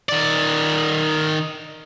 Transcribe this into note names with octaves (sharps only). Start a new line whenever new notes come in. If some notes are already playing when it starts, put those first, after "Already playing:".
D#3 D5